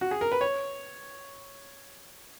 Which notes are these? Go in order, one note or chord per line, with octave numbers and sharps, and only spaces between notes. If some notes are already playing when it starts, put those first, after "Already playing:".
F#4
G#4
A#4
B4
C#5